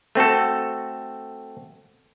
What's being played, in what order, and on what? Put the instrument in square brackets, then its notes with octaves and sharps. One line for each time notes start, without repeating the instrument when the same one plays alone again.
[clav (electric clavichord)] A3 C4 F#4 A4